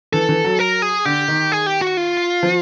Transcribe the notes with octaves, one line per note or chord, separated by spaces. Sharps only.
E3 A4
E3
F#3
A#4
G#4
D3 G4
D#3
G#4
G4
F#4
F4
F3